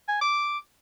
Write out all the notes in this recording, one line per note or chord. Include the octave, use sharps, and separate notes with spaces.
G#5
D6